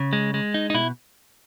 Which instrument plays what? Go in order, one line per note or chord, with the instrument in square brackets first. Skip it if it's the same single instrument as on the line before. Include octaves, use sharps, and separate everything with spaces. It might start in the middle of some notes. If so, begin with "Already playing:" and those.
Already playing: [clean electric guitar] C#3
G#3
G#3
D#4
D#4
B2 E4